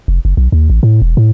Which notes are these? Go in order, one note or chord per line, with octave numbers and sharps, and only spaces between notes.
F1
F#1
B1
D#2
A1
A2
E1
A2